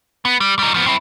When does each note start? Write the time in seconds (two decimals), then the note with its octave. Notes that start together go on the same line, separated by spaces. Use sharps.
0.25 B3
0.40 G3
0.59 G3 D#4
0.74 F3 B3
0.86 C4 E4